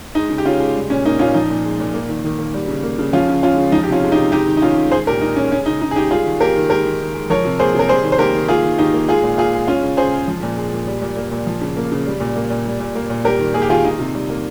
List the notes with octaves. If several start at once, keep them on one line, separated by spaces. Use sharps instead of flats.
G#3 D#4
C#3
G4
C#3 C#4 F4
G#3
G3
A#2 C#4
A#3 D#4
A#2 C#4 F4
F3 D#4
A#2
G#3
A#2
A#3
D#3
D#3
A#3
G3
C#3
A#3
C#3
F3 C#4 F4
C#3
G#3 C#4 F4
C#3
F3 D#4
G4
C3 C#4 F4
G#3
D#4 G4
C3
G#3 D#4 G4
D#3
D#4
D#3 C#4 F4
G#3
G#3 G#4 C5
A#2 G4 A#4
A#2 D#4
G#3 C#4
G#3 C#4
C#3 D#4
C#3 D#4
G#4
G#3 D#4 G4
G3 F4 G#4
D#3
A#3 G4 A#4
D#3
G#3 G4 A#4
D#3
D#3
G#3
F3 A#4 C#5
C3
A#3 G#4 C5
C3 A#4
G3 G#4 C5
D#3
C5
A#3 G4 A#4
D#3
A#3 F4 G#4
D#3
D#3 D#4 G4
A#3
G#3 F4 G#4
A#2
A#2 F4 G#4
G#3
G#3 C#4 F4
C#3
C#3 G#4 C5
G#3
F3
A#2
G#3
A#2
G3
A#2
A#3
A#2
F3
C#3
A#3
C#3
G3
A#2
A#3
A#2
G3
A#2
A#3
A#2
G3 G4 A#4
D#3
A#3 G#4
G4
D#3 F4 G#4
D#3 D#4
C3
G3
A#3